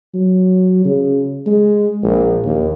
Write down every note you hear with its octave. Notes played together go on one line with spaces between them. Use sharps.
F#3
C#3
G#3
A#1
D#2